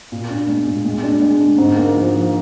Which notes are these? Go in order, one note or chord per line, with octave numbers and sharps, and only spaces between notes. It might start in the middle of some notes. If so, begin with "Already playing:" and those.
A#2
D4
G#3
A#2
G#3
D4
G#3
D3
G#2
A#3
F3
F3